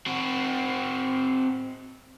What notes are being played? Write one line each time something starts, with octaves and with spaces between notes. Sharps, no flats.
C4 F#4